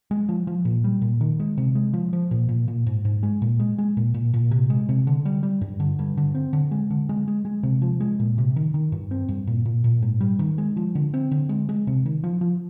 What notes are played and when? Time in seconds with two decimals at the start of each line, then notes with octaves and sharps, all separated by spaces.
0.11 G#3
0.29 F3
0.47 F3
0.65 A#2
0.84 G3
1.02 A#2
1.21 D#3
1.40 G#3
1.57 C3
1.75 G#3
1.93 F3
2.13 F3
2.31 A#2
2.49 A#2
2.68 A#2
2.87 G#2
3.05 G#2
3.23 G#3
3.42 A#2
3.60 G#3
3.78 G#3
3.97 A#2
4.14 A#2
4.34 A#2
4.51 C3
4.70 G#3
4.89 C3
5.07 D3
5.25 G3
5.43 G3
5.61 G2
5.80 D3
5.99 G2
6.17 D3
6.35 C4
6.53 D3
6.71 G#3
6.90 D3
7.09 G#3
7.28 G#3
7.45 G#3
7.63 C3
7.82 F3
8.00 G#3
8.20 A#2
8.38 C3
8.56 D#3
8.74 D#3
8.92 G2
9.11 C4
9.29 G2
9.47 A#2
9.65 A#2
9.84 A#2
10.02 G#2
10.21 G3
10.39 D#3
10.58 G#3
10.76 F3
10.95 D3
11.14 C4
11.31 D3
11.49 G#3
11.69 G#3
11.87 C3
12.06 D#3
12.24 F3
12.41 F3